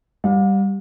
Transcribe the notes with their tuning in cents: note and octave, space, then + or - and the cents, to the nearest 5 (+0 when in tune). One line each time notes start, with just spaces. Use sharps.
G3 +0 F5 +45